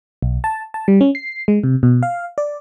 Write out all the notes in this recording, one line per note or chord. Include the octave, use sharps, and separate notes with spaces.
B1
A5
A5
G3
C#4
C7
G#3
C3
B2
F5
D5